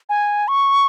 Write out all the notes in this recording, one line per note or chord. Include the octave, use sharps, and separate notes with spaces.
G#5
C#6